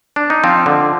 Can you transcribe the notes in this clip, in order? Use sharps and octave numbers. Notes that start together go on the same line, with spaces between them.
D4
D#4
F3 C4 F4
D3